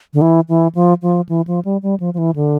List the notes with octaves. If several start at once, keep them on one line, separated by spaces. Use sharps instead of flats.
D3
E3
E3
F3
F3
E3
F3
G3
G3
F3
F3
E3
D3